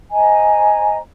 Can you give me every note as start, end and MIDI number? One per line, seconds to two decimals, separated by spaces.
0.11 0.97 72
0.11 0.97 75
0.11 0.97 80
0.11 0.97 82